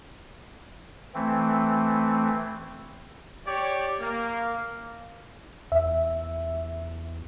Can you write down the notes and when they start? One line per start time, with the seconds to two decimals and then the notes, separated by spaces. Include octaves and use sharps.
1.14 E3 A3 C4
3.47 G4 C#5 D5
4.00 A#3
5.72 E2 E5